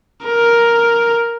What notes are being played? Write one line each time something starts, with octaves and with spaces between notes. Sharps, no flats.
A#4